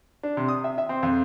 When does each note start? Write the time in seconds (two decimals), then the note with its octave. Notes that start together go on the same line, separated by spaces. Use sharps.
0.23 D4
0.37 C3
0.48 D#6
0.64 E5
0.78 E5
0.89 C4
1.03 F2